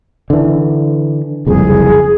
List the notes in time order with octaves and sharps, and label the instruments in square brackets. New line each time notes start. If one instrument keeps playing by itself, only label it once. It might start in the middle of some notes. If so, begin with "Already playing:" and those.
[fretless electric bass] D3 E3
[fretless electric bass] F#1 C2 F2 [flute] G#4